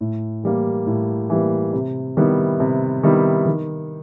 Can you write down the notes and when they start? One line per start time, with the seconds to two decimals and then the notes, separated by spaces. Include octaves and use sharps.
0.01 A2
0.43 E3 G3 A#3
0.86 A2
1.30 E3 G3 A#3
1.73 C3
2.17 D#3 G3 B3 E4
2.60 C3
3.03 D#3 G3 B3 E4
3.46 D#3